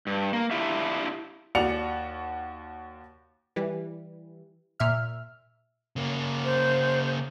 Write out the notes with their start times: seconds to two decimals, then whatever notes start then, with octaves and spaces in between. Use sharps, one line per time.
0.07 G2
0.33 A#3
0.51 D4 E4 F4 G4 E5
1.55 D#2 F#4 D5 C#7 F7
3.56 E3 G3
4.80 A#2 E5 F6
5.96 C#3 A#3
6.45 C5